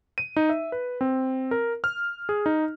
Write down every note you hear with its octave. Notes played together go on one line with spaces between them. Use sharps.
D#7
D#4
E5
B4
C4
A#4
F6
G#4
D#4